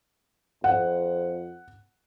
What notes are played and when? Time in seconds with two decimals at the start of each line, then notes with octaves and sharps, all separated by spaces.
0.64 F2 F#5